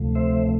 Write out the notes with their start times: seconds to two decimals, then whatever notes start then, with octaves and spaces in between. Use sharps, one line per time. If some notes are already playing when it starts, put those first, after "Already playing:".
Already playing: D2 C3 F3 A3
0.15 C5 E5